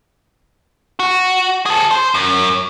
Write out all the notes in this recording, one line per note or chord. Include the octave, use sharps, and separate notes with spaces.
F#4
G#4 A4
C5
F#2